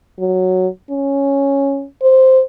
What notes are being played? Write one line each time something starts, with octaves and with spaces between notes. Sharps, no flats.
F#3
C#4
C5